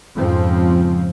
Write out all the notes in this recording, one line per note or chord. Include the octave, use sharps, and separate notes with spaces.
F2 G#2 C#3 F3 C4